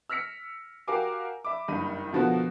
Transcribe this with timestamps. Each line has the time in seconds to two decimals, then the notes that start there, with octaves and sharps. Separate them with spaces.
0.09 E6 F6 A#6 B6 C#7
0.88 F#4 G4 A#4 F5 G#5 D6
1.45 E5 B5 D6
1.68 F#1 G2 D#3 B5 D#7
2.13 B2 D3 F3 B3 F#4 A#4